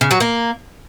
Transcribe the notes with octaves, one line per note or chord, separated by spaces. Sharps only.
C#3
F#3
A#3